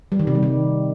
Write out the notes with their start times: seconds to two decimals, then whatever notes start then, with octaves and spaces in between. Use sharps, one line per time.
0.12 G3
0.19 D#3
0.27 C3
0.35 G3
0.43 D#3